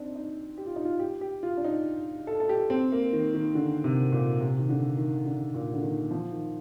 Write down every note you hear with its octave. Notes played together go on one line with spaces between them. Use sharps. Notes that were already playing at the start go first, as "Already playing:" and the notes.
Already playing: C4 D4 D#4
D#4
G4
F4
D#4
F4
G4
G4
F4
D4
D#4
A4
A4
G4
C4
A#3
D#3
D#3
D3
C3
A#2
C3
D#3
D3
D#3
D3
A#2
D3
D#3
F3
D#3